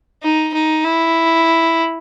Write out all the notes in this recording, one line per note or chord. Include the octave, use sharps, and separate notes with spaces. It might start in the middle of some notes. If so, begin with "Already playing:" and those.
D#4
D#4
E4